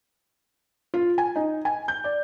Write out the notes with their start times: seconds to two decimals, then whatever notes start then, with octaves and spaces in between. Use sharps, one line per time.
0.94 F4
1.18 G#5
1.36 D#4
1.65 G#5
1.88 G6
2.04 D5